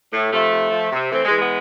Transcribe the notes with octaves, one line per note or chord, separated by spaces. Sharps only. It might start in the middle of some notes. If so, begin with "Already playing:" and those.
A2
C3 F3 A3
C3
F3
C3
E3 A3 C4
G#3
E3
G#3 B3